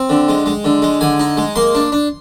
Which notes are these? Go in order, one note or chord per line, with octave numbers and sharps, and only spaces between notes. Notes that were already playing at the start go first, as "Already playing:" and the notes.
Already playing: C4 G5
D3
G#3
G#3
D3
G#3
D3 G#5
D#4
G#3
A#3 C6
D4
D4